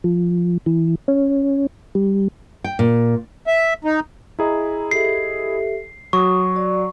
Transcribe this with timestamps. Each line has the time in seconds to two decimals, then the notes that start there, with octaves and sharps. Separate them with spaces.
0.04 F3
0.66 E3
1.08 C#4
1.95 G3
2.64 G5
2.79 A#2
3.47 E5
3.85 D#4
4.39 E4 G#4 D#5 A#5
4.91 G4 A4 E5 C7
6.13 F#3 F#4 C#6 D#6
6.55 F#4 D5